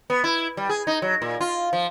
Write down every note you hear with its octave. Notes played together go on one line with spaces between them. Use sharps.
B3
E4
G3
G#4
D#4
F#3
A#2
F4
F3